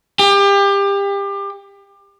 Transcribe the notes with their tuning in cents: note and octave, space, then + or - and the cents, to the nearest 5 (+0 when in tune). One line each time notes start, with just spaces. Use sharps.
G4 +30